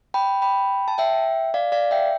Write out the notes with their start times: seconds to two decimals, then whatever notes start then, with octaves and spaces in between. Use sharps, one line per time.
0.14 G5 B5
0.42 G5 B5
0.88 A5
0.98 E5 G5
1.54 D5 F5
1.72 D5 F5
1.91 E5 G5